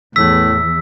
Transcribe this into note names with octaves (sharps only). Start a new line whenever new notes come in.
E2 A2 E6 B6